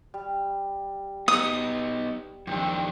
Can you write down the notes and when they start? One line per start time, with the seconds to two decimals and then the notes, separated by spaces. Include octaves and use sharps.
0.14 G3
1.28 B3 D#4 D#6
2.47 F2 D#3 C4 D4 G4